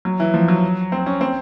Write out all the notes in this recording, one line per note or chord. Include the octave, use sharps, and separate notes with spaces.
F#3
E3
F3
F#3
C4
C#4
C4